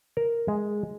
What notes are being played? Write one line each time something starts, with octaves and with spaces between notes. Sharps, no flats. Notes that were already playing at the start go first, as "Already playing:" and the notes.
A#4
G#3